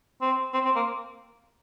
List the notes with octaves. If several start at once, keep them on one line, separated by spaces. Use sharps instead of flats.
C4
C4
C4
A#3